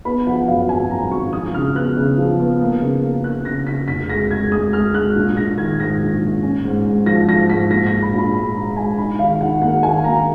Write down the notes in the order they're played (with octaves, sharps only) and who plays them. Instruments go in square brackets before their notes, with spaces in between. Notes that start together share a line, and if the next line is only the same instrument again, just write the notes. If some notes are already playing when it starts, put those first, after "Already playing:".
[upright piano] B3 B5
F3 F#5
F#2 F5
G#1 G#5
F#2 A#5
G#1 C#6
F3 D#6
C#3 F6
B3 F#6
C#3
F3
B3
A#3
C#3
A#3
A#3 F#6
C#3 A#6
C#3 B6
F1 B6
G#3 A#6
G#3 G#6
G#3 D#6
G#3 F6
G#3 F#6
A#1
A#1 A#6
D#3 G#6
G#2 A#6
A#1
A#1
C#4
G#2
G#2
F3 A#6
F3 A#6
G#2 B6
A#2 A#6
A#6
A#2
B5
A#1
B5
G#3 B5
G#3 A#5
G#3 G#5
D#4 B5
D#3 F5
D#3 F#5
A#3 F#5
D#3 G#5
A#3 A#5